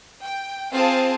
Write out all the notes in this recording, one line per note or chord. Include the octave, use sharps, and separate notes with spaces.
G5
C4 F4 G#4 C5 F5 A5